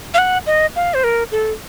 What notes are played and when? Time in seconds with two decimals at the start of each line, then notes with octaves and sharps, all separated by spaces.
0.14 F5
0.18 F#5
0.47 D#5
0.76 F5
0.94 C5
1.04 A#4
1.32 A4